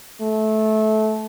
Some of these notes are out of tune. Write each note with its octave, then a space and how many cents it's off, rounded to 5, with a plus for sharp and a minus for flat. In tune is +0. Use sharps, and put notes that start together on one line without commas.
A3 -20